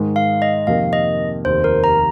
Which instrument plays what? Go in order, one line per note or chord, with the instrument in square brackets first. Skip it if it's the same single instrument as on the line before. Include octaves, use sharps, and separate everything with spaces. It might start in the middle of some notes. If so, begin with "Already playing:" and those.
Already playing: [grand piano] G#2 D#3 G#3
[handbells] F5
D#5
[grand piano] F2 C3 D#3 A#3 [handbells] F5
[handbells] D#5
[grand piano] F1 D#2 D#3 [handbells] C5
[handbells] A#4
A#5